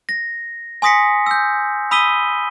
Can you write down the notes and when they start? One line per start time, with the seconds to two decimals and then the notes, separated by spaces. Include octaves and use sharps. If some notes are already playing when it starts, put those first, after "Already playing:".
0.09 A#6
0.82 G#5 C6 D#6 A#6 B6 C#7
1.26 E6 G6
1.91 B5 D#6 E6 B6 D#7 G7